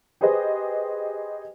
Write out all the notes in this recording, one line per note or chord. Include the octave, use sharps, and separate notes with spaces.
G4 G#4 B4 C5 D#5